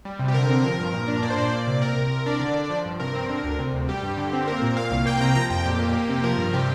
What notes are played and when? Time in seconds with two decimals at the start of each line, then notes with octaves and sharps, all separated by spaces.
0.05 G3
0.19 C3
0.28 G4
0.34 D3 A#4
0.50 C4
0.64 F3 A#4
0.79 G2
0.93 A#2
1.08 D4
1.22 A#3 D5
1.30 C5
1.37 A#2 D5
1.52 A#3
1.67 C3
1.82 C3 A#4
1.96 C2
2.11 C3 A#4
2.26 D4 D5
2.40 D3
2.55 D4
2.70 F3
2.85 G2
3.00 C3 A#4
3.15 C4
3.29 D3
3.44 D2
3.59 C3
3.73 D2
3.88 G3 G4
4.03 G2
4.17 D3
4.33 C4
4.47 A#3 A#4
4.62 A#2
4.77 A#2 F5
4.91 C2
5.05 A#3 G5
5.20 C3 A#5
5.35 F3 A#5
5.50 F2 G5
5.66 A#2 G4
5.79 A#3
5.94 A#3
6.09 C3
6.23 F3 A#4
6.38 G2
6.53 C3 G4